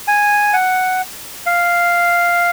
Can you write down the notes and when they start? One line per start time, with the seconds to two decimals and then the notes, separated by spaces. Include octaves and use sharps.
0.08 G#5
0.53 F#5
1.46 F5